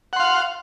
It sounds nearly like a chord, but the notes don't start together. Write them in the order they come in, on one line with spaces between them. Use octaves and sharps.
F#5 C6 F5